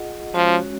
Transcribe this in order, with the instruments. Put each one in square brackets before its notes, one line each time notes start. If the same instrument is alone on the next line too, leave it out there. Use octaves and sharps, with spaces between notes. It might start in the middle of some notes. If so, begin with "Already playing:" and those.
Already playing: [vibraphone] F4 G#4 D#5 F#5
[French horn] F3 [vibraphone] G#3 C#4 F#4 C#5